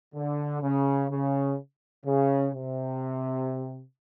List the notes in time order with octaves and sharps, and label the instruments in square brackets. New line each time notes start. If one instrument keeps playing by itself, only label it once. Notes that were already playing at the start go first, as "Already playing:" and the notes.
[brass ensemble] D3
C#3
C#3
C#3
C3